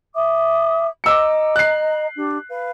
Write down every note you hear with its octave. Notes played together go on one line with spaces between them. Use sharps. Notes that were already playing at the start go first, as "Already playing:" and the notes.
E5 D6 D#6
D#5 A#5 D6 E6 C#7
F#6 C7
D4 G4
B4 F5